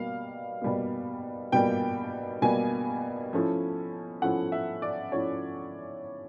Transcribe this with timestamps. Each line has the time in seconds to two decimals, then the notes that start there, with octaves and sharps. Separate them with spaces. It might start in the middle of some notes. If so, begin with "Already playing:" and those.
Already playing: B2 G3 A#3 F5
0.62 B2 G3 A#3
1.52 B2 G3 A#3 G5
2.42 B2 G3 A#3 G#5
3.33 F3 A3 C#4 E4
4.22 F3 A3 C#4 E4 F#5
4.52 E5
4.82 D5
5.12 F3 A3 C#4 E4 C#5